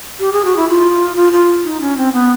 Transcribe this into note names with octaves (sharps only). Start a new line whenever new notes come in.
G4
G#4
F#4
E4
F4
F4
F4
D#4
C#4
C4
B3